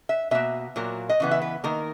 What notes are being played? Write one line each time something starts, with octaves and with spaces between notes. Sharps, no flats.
E5
B2 A#3 E5
A#2 F#3 A#3
D#5
C#3 E3 B3
E5
B4
D#3 A#3 A#4